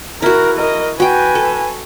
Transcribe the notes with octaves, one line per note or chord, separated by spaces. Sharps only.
E4 F#4 A#4
A#4 D#5
F#4 B4 G5 G#5
A4